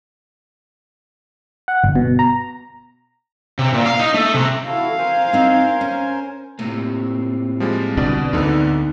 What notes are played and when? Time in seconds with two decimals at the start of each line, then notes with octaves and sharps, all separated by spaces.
1.68 F#5
1.84 G1
1.95 B2
2.19 A#5
3.59 C3
3.74 A#2
3.86 F5
3.99 D#4
4.14 A3
4.34 C3
4.67 E4 F#4 A4 F5
4.98 A#4 C5 G#5
5.33 C4 D#4
5.81 C#4
6.59 A2 C3 A3 A#3
7.60 F3 G3 G#3
7.97 C2 B2 D3 D4 D5
8.33 D2 G#2 D3 B3 D#4